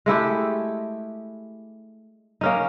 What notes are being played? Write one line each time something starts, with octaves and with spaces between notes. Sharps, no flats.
G#3 A3 E4 G4
A#3 C#4 D#4